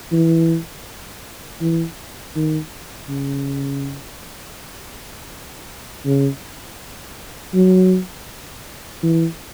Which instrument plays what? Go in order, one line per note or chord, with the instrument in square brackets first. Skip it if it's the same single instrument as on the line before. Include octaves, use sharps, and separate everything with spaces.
[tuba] E3
E3
D#3
C#3
C#3
F#3
E3